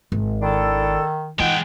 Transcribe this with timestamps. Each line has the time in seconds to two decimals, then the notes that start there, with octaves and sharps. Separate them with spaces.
0.12 G#1
0.42 D#3 D4 E4 A4
1.39 E3 G#3 D#4 F4 F#5 G5